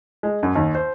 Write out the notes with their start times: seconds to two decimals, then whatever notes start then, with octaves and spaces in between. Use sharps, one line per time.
0.23 G#3
0.43 F#2
0.55 D#2
0.75 C5